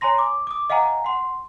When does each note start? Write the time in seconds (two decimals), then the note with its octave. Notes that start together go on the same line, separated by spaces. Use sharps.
0.01 C#5 G#5 A#5 C6 A#6
0.18 D6
0.47 D6 D#6
0.70 D#5 F5 F#5 G#5 A#5
1.04 F#5 C6